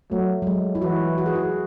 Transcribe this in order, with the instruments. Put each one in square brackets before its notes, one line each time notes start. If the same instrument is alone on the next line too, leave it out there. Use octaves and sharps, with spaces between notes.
[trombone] F#3 [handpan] A3
[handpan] F#3
G#3
E4
[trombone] E3 [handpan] F#4
[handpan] F#4
G#4
F#4